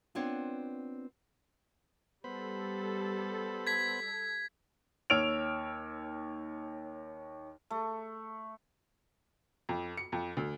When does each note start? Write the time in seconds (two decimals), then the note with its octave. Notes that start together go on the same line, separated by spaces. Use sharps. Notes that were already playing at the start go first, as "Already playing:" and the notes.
0.15 B3 C4 D4 F4 C#5
2.24 G3 B3 A4 C5 B5
3.67 G#6 B6
5.10 D#2 C#5 E6 F6 D7 F7
7.70 A3
9.69 F2
9.97 C#7
10.12 F2
10.37 D2